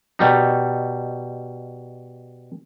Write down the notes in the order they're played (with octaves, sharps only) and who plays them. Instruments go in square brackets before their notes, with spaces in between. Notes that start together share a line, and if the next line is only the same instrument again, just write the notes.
[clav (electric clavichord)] B2 G3 D#4